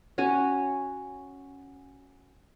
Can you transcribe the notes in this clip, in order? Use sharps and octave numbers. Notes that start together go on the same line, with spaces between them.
C#4 F#4 G#5